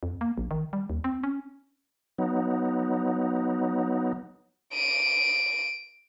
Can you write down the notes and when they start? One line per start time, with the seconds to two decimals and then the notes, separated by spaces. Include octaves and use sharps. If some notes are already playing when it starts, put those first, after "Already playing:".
0.03 F2
0.21 A#3
0.38 A#1
0.51 D#3
0.73 G3
0.90 D#2
1.04 C4
1.23 C#4
2.18 F#3 B3 D#4
4.73 D7 D#7